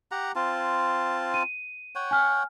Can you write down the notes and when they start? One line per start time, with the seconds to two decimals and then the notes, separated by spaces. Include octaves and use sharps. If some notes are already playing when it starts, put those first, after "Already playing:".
0.11 G4 F#5 A#5
0.36 C4 F4 A5
1.34 D#7
1.95 C#5 F#5 G5
2.11 G#5 F6